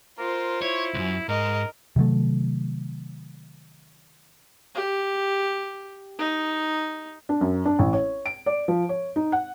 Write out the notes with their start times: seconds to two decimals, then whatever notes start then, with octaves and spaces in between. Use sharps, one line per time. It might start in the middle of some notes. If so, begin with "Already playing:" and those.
0.19 F4 A#4 C5
0.62 E4 C#5
0.94 C#2 F#2
1.29 G#2 A#4 D#5
1.96 C3 D#3 F#3 A3
4.75 G4
6.19 D#4
7.29 D4
7.41 F#2
7.65 D4
7.79 A1
7.93 C#5
8.26 D7
8.46 D5
8.68 F3
8.89 C#5
9.16 D#4
9.32 F#5